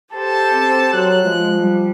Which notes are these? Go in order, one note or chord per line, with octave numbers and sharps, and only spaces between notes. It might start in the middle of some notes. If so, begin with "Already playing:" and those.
G4 A4 C5 A5
C4
F#3 F#6
F3 G#3
G3